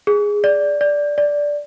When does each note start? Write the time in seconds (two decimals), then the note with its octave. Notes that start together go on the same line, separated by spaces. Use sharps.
0.07 G#4
0.44 D5
0.81 D5
1.18 D5